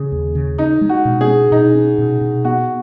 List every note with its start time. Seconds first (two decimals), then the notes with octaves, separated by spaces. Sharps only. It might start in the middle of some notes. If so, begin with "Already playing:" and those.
Already playing: C#3 G#4
0.12 D#2
0.35 C#3
0.58 C#4 D#4
0.81 G#3
0.89 F#4
1.05 B2
1.21 G#4
1.28 C#4
1.52 B2 D#4
1.75 C#4
1.98 B2
2.21 B2
2.45 B3 F#4